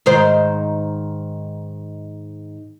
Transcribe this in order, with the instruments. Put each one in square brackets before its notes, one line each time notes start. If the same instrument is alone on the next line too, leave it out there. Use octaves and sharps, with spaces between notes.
[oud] G#2 D#3 C5